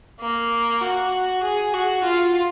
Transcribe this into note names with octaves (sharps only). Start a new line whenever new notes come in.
A#3
F#4
G#4
F#4
F4